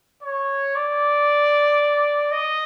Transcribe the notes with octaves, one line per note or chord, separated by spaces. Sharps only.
C#5
D5
D#5